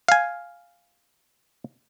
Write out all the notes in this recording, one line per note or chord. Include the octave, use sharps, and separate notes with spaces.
F5 G#5